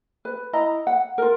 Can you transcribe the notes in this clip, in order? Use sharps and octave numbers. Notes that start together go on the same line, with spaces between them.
B4
E4 D#5 A#5
F#5
F4 A#4